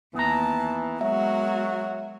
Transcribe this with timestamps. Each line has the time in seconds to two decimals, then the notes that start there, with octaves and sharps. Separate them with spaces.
0.15 D#2 E3 B3 A5 A#5
1.01 F#3 G#3 F#4 A#4 E5